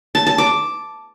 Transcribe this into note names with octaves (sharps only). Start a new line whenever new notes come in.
A5
A5
D6